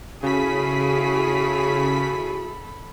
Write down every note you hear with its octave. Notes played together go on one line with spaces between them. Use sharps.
C#3 E4 F#4 G#4 A4 B5 B6